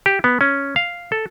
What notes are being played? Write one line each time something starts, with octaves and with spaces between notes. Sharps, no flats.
G4
B3
C#4
F5
A4